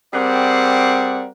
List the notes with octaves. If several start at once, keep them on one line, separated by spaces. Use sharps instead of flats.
G3 C4 G#4 A#4 D5 F#5